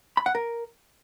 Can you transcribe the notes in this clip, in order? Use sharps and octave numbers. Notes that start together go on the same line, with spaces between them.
B5
F#5
A#4